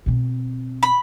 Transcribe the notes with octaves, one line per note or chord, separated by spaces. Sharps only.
B2 C4
B5